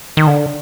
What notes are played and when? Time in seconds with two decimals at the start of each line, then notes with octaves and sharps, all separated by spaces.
0.17 D#3
0.27 D3